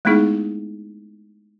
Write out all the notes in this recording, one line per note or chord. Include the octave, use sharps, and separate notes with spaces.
G#3 A3 B3 D#4 E4 G#4